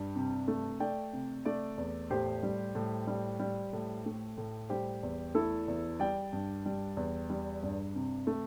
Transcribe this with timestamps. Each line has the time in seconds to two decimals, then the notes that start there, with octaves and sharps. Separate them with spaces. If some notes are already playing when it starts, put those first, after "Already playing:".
Already playing: G2 G3
0.16 C3
0.48 A3
0.80 A3 D5 G5
1.13 C3
1.45 A3 A4 D5
1.78 E2
2.10 A2 G4 C5
2.43 G3
2.75 A2
3.07 G3
3.40 G3
3.73 A2
4.06 A3
4.38 A2
4.69 G3 G4 C5
5.03 E2
5.34 A3 E4 A4
5.68 E2
5.99 G3 D5 G5
6.33 G2
6.66 G3
6.97 E2
7.30 G3
7.63 G2
7.95 C3
8.27 A3